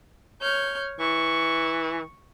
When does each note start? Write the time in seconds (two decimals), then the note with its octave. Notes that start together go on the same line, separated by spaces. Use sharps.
0.41 C#5 F6 G6
1.00 E3 C#6